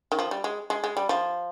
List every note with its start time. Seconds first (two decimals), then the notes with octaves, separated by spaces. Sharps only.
0.12 D#3
0.19 F3
0.31 G3
0.44 G#3
0.70 G#3
0.84 G#3
0.97 G3
1.09 F3